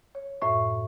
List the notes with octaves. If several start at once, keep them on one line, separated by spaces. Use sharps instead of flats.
C#5
F#2 A2 E5 C#6